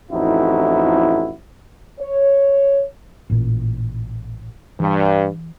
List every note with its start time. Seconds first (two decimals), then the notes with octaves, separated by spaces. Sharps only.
0.11 A1 F2 D#4 E4 F#4
1.99 C#5
3.30 A1 A#2
4.80 G2 E3